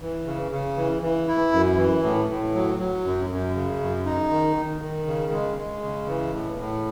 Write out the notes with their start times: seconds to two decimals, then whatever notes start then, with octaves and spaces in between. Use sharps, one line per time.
0.02 E3
0.26 C#3
0.52 C#3
0.77 E3
1.02 E3
1.28 E4
1.53 F#2
1.78 E3
2.03 A2
2.29 A2
2.55 F#3
2.79 F#3
3.04 F#2
3.30 F#2
3.55 C#3
3.80 F#2
4.06 D#4
4.30 D#3
4.56 D#3
4.81 D#3
5.07 C#3
5.32 G#3
5.57 G#3
5.82 C#3
6.08 E3
6.33 A2
6.58 A2